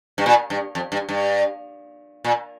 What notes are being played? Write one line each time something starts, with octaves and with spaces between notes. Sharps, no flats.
G2
A#2
G2
F2
G2
G2
A#2